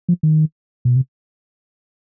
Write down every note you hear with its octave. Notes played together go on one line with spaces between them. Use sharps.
F3
D#3
B2
C3